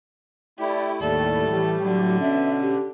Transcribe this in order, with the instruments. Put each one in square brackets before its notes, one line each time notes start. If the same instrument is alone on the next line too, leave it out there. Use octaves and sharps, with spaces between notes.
[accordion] A3 E4 [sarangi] G4 [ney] D5
[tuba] D#2 [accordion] A2 G3 A3 [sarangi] A4 [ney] D5
[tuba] E3 [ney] G4
[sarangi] D3 [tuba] F#3
[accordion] B2 [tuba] C#4 [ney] E5
[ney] G4